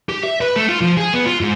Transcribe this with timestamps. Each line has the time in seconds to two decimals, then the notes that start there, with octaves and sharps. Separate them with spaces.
0.09 G4
0.23 E5
0.41 B4
0.56 A3
0.69 F4
0.81 F3
0.97 G#4
1.14 B3
1.26 F4
1.41 G#2